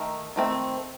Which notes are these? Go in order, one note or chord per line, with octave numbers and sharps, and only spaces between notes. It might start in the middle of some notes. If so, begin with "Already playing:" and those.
Already playing: D#3 A3
D#3 A3 C4